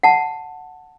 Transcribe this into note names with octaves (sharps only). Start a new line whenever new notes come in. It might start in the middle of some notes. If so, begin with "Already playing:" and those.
F#5 A5